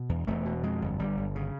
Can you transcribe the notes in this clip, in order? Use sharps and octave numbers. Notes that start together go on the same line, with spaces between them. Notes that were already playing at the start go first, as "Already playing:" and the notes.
Already playing: B2
E2
E1 A3
B2
F2 G#3
G1
G1 G3
G1
C#3